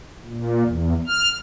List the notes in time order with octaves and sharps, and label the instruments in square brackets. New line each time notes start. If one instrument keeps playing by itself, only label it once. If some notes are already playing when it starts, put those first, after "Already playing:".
[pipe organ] A#2
E2
F6